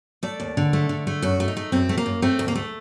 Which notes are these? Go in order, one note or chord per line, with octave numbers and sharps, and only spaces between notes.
A3 D5
D#2
D3
A3
D3
A3
F#2 F#4
A3
D#4
A3
F#2 C4
A3
A#3
F#2
A3 C4
D2
A#3
A3